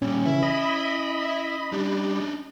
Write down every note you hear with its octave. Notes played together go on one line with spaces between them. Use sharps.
A#2 G3 C#4
C#3 E3 E4 E5
D#5 B5
G3 D4 D#4